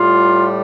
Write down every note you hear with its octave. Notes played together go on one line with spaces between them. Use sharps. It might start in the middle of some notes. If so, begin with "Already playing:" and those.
Already playing: A2 G3 F4